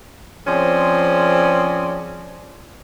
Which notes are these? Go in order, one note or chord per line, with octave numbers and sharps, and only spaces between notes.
F3 C4 C#4 G#4 C5 D5